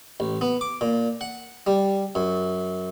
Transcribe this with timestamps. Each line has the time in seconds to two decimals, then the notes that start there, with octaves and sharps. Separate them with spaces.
0.20 A1
0.41 B3
0.61 D6
0.81 A#2
1.21 F#5
1.67 G3
2.15 F#2